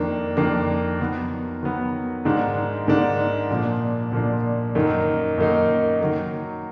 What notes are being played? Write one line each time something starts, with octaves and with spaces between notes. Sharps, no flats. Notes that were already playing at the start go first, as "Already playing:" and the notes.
Already playing: F2 D#3 A#3 D4
F2 D#3 A#3 D4
D#3 F#3 B3
D#3 F#3 B3
G#2 D#3 G#3 D4
G#2 D#3 G#3 D4
A#2 F3 A#3 D4
A#2 F3 A#3 D4
F#2 D#3 A#3 D#4
F#2 D#3 A#3 D#4
D#3 F#3 A#3